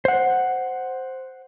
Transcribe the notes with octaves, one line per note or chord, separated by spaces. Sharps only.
C5 F#5